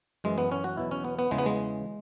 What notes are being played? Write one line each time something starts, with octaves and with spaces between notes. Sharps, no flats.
F#2 E3 G#3
B3
C#4
F#4
E2 B2 F#3 E4
C#4
B3
B3
E2 C#3 E3 G#3
B3
G#3